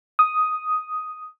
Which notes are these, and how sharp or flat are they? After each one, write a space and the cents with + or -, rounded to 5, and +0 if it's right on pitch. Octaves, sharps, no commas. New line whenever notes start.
D#6 +5